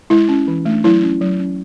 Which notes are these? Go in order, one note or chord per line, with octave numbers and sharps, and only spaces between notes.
G#3 E4
C#4
E3
A3 D4
F#3 E4
A3 C#4
F#3
C#4